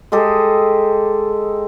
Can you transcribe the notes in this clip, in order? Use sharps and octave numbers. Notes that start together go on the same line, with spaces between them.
G#3 G4 A4 D#5